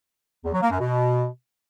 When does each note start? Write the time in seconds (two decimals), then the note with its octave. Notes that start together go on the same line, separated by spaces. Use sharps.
0.44 E2
0.53 F#3
0.62 A#3
0.71 F#2
0.80 B2